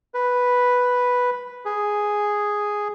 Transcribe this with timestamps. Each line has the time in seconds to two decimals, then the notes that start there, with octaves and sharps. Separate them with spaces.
0.14 B4
1.65 G#4